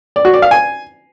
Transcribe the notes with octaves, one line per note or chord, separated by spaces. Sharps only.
D5
F#4
D5
F5
G#5